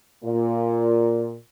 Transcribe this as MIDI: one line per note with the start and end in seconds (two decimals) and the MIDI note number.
0.24 1.36 46